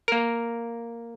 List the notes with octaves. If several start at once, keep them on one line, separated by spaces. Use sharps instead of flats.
A#3 A#4